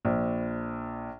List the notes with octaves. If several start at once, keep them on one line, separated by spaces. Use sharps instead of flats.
A#1